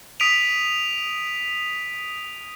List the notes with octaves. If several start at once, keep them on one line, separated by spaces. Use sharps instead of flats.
D#6 B6 D7 D#7 F7